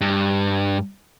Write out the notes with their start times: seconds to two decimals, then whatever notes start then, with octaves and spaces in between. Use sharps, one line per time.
0.01 G2